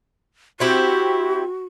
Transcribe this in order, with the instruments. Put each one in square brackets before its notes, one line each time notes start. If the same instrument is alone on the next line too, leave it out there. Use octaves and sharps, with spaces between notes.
[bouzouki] C4 E4 G4 [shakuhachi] F#4